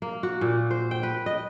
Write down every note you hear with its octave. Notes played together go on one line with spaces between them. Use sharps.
A#3
F#4
A#2
C5
G5
B4
D#5